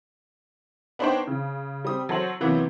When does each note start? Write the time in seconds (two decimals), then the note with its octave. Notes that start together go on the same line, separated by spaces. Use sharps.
0.99 B3 D4 D#4 C5 C#5 G5
1.27 C#3
1.84 G3 C4 D#6
2.09 F#3 A4 C5 F#7
2.41 C3 E3 F#3 A#3 B3